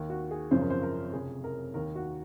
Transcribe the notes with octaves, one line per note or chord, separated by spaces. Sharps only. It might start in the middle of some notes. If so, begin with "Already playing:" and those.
Already playing: D#2 D#3
F#4
G#4
G#1 F#2 C#3 F3 C5
A#4
C5
A#4
F1 F2 C#3 G#4
A#4
D#2 D#3 A#4
F#4